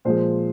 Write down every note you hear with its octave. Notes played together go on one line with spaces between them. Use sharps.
A#2 F3 G#3 C5